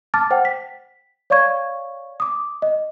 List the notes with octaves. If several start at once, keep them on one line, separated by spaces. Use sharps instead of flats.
A5 D6 F6 A6
C5 F#5 G5
B6
C#5 D5 F5 C#6 G#6
D6 D#6
D#5